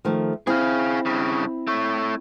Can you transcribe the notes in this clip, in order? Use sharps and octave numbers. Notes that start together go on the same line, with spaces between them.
D#3 F3 A3
C4 E4 G#4 F5
G2 C#3
A3 C#5